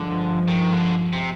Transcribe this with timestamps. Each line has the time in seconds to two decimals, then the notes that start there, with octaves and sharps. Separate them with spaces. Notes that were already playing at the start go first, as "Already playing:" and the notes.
Already playing: G2 D3 F3 G#3
0.48 D#3
0.73 D3
1.13 C3